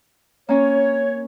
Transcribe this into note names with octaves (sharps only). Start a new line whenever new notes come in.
A#3 C#4 C#5